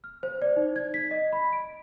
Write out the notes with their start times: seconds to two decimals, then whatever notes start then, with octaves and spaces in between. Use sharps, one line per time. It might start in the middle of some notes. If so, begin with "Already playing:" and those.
0.04 F6
0.23 C5
0.42 D5
0.56 D#4
0.76 G#6
0.94 B6
1.11 D#5
1.33 B5
1.53 D7